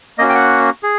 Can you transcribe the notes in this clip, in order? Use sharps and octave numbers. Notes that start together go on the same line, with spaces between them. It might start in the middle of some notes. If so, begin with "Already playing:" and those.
A#3 C#4 F#4 D#5
G5
F#5
G#4